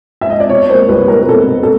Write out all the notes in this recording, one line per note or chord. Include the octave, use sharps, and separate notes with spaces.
E5
D#5
D5
B2 C#5
A#3 C5
C2 B4
B2 A#4
A#4
B2 A4
B2
A4